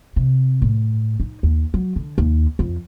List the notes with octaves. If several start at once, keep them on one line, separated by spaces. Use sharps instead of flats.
C3
A2
D#4
D#2
F#3
D3
D#2
F2